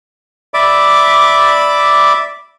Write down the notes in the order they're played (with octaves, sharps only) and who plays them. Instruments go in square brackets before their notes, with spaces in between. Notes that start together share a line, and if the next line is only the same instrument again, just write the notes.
[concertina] D5 E5 B5 D6